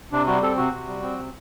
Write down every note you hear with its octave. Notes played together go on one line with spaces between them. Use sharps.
C3 D4
G3 F#4
C4 A4
C3 F#4
C3
G3
C4
C3